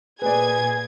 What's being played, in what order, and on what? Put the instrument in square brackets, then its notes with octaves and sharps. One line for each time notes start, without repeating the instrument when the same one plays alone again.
[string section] A#2 G#6 [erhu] G#4 [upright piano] B4 D5 [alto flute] G#5